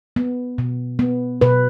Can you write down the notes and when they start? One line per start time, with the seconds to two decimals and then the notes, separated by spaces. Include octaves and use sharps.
0.16 B3
0.58 B2
0.99 B3
1.41 B2 B4